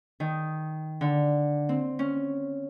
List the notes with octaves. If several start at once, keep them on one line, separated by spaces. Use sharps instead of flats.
D#3
D3
C4
C#4